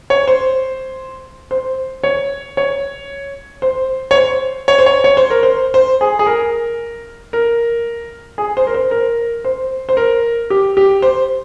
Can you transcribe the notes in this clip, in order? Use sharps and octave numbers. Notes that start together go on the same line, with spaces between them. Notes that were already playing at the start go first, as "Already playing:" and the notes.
C#5
C5
C5
C#5
C#5
C5
C#5
C5
C#5
C5
C#5
C#5
C5
A#4
C5
C5
G#4
G#4
A#4
A#4
G#4
C5
A#4
C5
A#4
C5
C5
A#4
G4
G4
C5